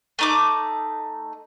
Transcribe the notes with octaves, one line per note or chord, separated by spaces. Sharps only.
A3 D#4 D6